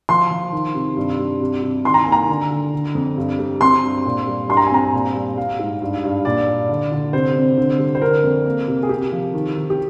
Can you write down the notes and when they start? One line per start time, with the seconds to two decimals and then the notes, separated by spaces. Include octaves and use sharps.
0.09 F3 C6
0.31 F3
0.52 D#3
0.75 C3
0.97 G2
1.19 G2
1.41 C3
1.63 C3
1.85 D#3 C6
1.94 A#5
2.03 A#3 G#5
2.12 A#5
2.29 D3
2.51 D3
2.73 D3
2.95 F2
3.17 G2
3.39 G3
3.61 C4 C6
3.83 G2
4.05 A#2
4.27 G3
4.49 G2 C6
4.57 A#5
4.66 G#5
4.71 C4 A#5
4.93 A#2
5.15 G3
5.37 G3 F5
5.59 G#2
5.82 G2
6.04 G2
6.25 A#2 D5
6.48 A#2
6.69 D3
6.92 D3
7.13 C3 C5
7.36 C4
7.58 D3
7.79 G3
7.95 C5
8.02 D3 A#4
8.24 F2
8.45 A#3
8.68 C3
8.83 G#4
8.89 C3 G4
9.12 F3
9.34 D#3
9.56 D#3
9.70 G4